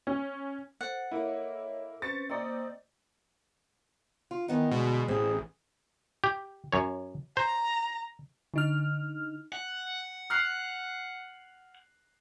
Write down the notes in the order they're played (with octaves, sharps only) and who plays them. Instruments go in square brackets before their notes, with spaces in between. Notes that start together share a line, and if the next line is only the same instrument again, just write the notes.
[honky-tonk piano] C#4
[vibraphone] A4 C5 [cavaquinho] F#5
[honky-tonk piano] A#3 E4 [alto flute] A4 [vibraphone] C#5 D#5
[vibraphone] C4 C#4 B4 [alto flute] C5 [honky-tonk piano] A6 C#7
[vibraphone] A#3 A#5 E6 [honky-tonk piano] C4 D5 D#5 [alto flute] C5
[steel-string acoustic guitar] F4
[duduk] D#3 [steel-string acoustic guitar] E3 B3 D#4
[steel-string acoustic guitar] D2 [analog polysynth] B2 [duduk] G#3
[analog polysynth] A1 [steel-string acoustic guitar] C4 [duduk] G#4
[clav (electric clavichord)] G4
F#2 C#5
[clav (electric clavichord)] C5 [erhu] A#5
[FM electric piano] D3 D#4 F6
[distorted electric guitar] F#5
[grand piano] F6 F#6 C7